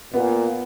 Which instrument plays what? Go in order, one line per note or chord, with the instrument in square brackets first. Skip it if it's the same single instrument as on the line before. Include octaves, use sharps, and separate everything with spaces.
[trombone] A#2 [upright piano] B3